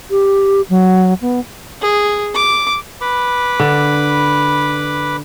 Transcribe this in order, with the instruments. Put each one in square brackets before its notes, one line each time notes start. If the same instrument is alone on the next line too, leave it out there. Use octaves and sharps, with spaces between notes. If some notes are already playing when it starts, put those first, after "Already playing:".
[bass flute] G4
F#3
B3
[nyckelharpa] G#4
D6
[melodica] B4 B5 D6
[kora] D3